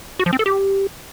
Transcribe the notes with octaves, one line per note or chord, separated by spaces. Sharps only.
F#4
F3
C4
A4
G4